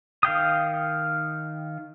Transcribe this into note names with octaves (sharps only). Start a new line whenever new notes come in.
D#3 F5 G5 D#6